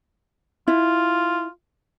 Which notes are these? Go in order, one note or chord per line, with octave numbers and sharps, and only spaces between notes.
E4 F4